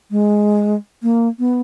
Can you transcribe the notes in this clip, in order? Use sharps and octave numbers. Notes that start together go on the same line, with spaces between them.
G#3
A#3
B3